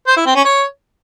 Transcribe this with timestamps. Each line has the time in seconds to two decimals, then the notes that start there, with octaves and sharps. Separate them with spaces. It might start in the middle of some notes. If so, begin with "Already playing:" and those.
0.07 C5
0.17 E4
0.26 C4
0.35 C#4
0.45 C#5